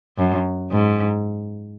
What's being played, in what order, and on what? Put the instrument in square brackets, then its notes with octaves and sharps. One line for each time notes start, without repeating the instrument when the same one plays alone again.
[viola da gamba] F#2
G#2